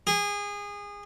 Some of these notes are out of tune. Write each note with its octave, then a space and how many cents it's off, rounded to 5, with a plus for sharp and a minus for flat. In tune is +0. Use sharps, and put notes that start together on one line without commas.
G#4 -25